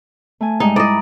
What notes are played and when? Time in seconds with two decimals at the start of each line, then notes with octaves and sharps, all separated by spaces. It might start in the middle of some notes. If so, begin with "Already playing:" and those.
0.41 A3 G#5
0.60 G#2 G3 G#3 D#4
0.76 E4 D5 D#5 A#5 D#6